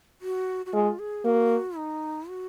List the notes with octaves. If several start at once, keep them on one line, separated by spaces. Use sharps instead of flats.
F#4
F#4
G#3 F4
G#4
A#3 F#4
D#4
F#4